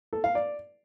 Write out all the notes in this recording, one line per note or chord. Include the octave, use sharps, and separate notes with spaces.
A4
F5
D5